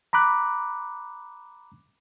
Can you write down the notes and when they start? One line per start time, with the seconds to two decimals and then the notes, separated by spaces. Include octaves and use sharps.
0.13 A#5 B5 D6 F#6